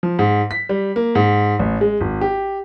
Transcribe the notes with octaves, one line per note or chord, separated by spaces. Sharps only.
F3
G#2
B6
G3
A#3
G#2
A1
G#3
G#1
G4